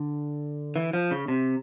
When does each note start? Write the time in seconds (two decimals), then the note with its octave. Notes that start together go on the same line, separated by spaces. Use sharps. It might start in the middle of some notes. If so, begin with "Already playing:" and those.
Already playing: D3
0.76 E3
0.93 F3
1.11 C#3
1.28 C3